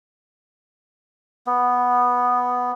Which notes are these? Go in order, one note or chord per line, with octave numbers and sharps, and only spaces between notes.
B3